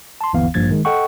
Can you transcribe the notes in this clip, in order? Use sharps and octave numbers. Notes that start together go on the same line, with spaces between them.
A5 C6
G1 D#2 E3 B3 F5
A1 G2 F3 A#3 G#6 A6
D#3 G#3
A4 D#5 F#5 G5 C#6